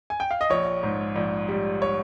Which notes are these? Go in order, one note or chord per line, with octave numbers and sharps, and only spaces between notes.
G#5
G5
F5
D#5
A#1 C#5
G#2
A#1
G3
C#5